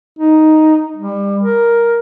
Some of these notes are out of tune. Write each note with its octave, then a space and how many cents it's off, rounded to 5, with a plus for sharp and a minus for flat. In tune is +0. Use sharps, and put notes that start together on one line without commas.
D#4 +5
G3 +30
A#4 +5